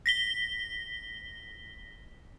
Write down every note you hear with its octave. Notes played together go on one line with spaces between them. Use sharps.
A#6 B6 G7